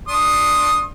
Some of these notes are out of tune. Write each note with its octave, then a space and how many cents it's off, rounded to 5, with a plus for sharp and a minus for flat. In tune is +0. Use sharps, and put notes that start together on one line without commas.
D4 +0 C6 +30 D#6 +0